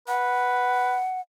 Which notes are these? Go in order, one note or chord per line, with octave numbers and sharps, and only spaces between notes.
B4 F#5